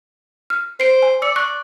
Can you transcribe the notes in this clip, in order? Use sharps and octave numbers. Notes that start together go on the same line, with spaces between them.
F6
C5 C7 D7
G#5
D5 E6 C#7
C#6 F#6